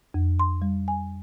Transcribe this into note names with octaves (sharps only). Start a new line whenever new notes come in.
F2
C6
G3
G#5